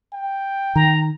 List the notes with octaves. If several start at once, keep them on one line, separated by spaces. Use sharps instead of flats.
G5
D#3 A#5